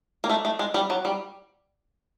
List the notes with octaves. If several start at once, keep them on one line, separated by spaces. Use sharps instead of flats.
A#3
A3
A3
G#3
G3
F#3
G3